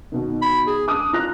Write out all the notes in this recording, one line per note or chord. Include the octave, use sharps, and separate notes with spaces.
B2 D#3
B5
G#4
D4 D6 D#6
F4 A#5 F#6 A#6